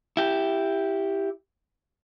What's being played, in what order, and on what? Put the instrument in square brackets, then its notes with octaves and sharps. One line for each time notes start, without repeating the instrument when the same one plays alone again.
[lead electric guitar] E4 G4